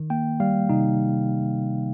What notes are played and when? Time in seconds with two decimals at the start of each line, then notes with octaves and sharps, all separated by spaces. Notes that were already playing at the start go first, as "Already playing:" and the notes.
Already playing: D#3
0.10 A#3 G5
0.40 G3 F5
0.69 C3 D#4